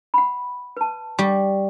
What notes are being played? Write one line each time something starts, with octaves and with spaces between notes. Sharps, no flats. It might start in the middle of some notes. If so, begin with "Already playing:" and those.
F#5 B5
B4 A5
G3 C#6